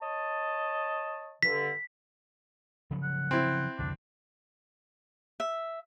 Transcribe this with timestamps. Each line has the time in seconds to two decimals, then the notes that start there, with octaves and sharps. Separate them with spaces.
0.01 C#5 D#5 A5
1.43 G2 D3 B6
2.91 C#3 F3 F#3
3.03 F#5
3.31 C4 E4
3.79 C2 F2 D3 D4
5.40 E5